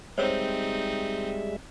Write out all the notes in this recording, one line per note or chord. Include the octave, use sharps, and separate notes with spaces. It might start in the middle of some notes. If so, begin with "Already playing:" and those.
G3 G#3 C4 D#4 C5 C#5 E5 E6